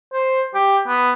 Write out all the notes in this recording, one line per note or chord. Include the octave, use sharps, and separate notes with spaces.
C5
G4
B3